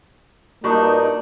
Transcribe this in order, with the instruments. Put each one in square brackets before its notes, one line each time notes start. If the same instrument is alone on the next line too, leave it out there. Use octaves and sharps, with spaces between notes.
[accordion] G2 D#4 [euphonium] A#3 [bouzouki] D4 [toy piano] F4 F#4 C#6